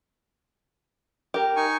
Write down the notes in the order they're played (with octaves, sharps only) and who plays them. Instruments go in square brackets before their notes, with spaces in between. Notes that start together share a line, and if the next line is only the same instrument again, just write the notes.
[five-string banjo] G4 A#4
[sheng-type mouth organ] D#4 G#5 C#6